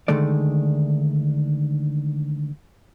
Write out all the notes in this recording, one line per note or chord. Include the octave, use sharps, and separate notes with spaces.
D3 D#3 G#3 A3 D5